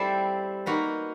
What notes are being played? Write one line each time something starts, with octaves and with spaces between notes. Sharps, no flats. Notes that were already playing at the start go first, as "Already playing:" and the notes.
Already playing: G3 C4 E4 A4 C5
A#3 D#4 F#4 B4